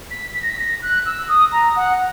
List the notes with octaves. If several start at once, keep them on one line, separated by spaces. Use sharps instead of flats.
B6
B6
A#6
B6
A#6
F#6
E6
D#6
A#5
F#5